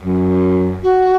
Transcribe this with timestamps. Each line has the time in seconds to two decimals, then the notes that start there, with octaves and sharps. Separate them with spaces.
0.04 F#2
0.82 F#4